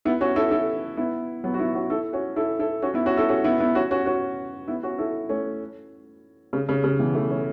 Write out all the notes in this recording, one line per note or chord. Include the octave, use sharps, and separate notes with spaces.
B3 E4
C#4 F#4
E4 A4
E4 A4
B3 E4
F#3 B3
F#4
B3 E4
C#4 F#4
E4 A4
C#4 F#4
E4 A4
E4 A4
C#4 F#4
B3 E4
C#4 F#4
E4 A4
C#4 F#4
B3 E4
B3 E4
C#4 F#4
C#4 F#4
C#4 F#4
B3 E4
C#4 F#4
E4 A4
A3 C#4
C#3
C#3
C#3
B2 E3
E3 A3
A3 C#4